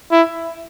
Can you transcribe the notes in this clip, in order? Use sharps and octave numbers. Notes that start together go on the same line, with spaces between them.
E4